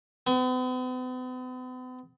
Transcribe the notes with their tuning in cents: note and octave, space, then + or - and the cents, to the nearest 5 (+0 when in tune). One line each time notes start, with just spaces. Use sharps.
B3 +45